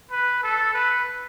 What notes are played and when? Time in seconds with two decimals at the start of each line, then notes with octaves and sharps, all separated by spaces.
0.11 B4
0.43 A4
0.74 B4